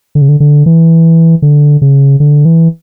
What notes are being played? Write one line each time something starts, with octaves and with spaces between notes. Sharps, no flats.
D3
C#3
D3
D3
E3
D3
C#3
D3
E3